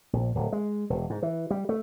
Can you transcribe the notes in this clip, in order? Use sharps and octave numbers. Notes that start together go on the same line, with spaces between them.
A#1
D1
G#3
E1
G#2
E3
G3
A3